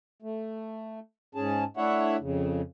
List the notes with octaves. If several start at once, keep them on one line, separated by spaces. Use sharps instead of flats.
A3
G#2 C#4 G#4 A5
A3 D4 E4 C#5 E5 F#5
F2 C#3